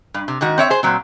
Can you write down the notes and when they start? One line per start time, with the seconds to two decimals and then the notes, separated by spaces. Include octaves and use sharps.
0.14 G2
0.28 C3
0.41 G#2 D#3 F#4
0.58 C4 C#5 E5
0.70 G#4 C5
0.83 A#2 F#3 C4